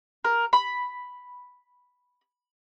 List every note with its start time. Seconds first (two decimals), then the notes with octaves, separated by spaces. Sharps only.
0.25 A#4
0.53 B5